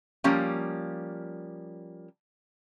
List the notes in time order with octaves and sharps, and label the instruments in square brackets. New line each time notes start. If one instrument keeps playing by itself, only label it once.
[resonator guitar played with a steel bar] F3 G3 A#3 C#4